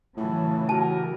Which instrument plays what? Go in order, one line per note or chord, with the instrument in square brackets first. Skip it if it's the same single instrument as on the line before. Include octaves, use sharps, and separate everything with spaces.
[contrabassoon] A2 [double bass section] C#3 E3 F#3 [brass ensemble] F4 A5
[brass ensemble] F#4 G4 A#4 [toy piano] A5